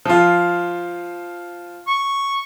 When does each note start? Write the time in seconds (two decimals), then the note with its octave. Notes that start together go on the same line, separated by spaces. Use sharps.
0.06 F3 F4
1.87 C#6